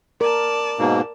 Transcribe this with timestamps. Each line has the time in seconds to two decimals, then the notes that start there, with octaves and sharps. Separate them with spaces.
0.21 A#4 D5 A5
0.79 G#2 B2 A#3